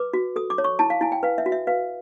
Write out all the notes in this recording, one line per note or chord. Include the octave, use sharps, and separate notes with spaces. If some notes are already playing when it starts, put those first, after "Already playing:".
Already playing: B4 D6
F#4
A4 D#6
D6
C#5
C#6
E4 A5
F5
E4 G#5
G5
B4 F5
E5
F#4
E5
B4 F5